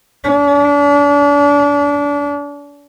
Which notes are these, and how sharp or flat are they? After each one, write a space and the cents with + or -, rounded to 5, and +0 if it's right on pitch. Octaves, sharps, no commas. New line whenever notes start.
D4 -35